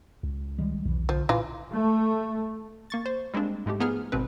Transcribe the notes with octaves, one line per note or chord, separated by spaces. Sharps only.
C#2
D#3 G3 G#3
B1 E2 C3 E3
D3 F3
A#2 E3 F4
A3
A#3 C#6 A6
C5
G3 G#3 A#3 C4 D4
G#2 G#3 A3 G4
F3 B3 D#4 G#4 F6
G#1 B2 C4 B4